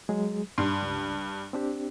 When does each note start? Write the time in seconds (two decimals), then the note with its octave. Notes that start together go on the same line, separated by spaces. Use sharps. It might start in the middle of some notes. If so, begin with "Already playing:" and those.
0.09 F#3 G#3 G#4
0.58 G2 C6
0.82 C#2
1.53 C4 D4 G4